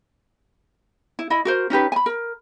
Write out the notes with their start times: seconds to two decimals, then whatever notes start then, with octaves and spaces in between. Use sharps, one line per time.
1.19 E4
1.30 E4 D#5 B5
1.45 F#4 A#4 C5
1.70 C#4 D#4 G4 B4
1.92 G#5 B5
2.06 A#4